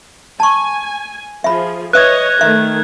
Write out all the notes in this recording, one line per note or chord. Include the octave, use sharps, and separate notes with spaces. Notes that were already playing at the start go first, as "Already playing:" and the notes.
G#5 A5 C#6
F3 G#4 E5 B5
B4 C#5 D#5 E5 D#6 F#6 G#6
D#3 A3 E5